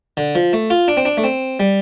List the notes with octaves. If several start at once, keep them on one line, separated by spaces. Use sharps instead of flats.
D3
F3
A3
F4
D4
C4
D4
A3
C4
G3